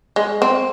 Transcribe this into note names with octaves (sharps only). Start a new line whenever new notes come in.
G#3
C4